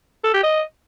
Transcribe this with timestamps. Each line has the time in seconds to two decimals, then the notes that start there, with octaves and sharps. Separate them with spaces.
0.24 A4
0.34 G4
0.44 D#5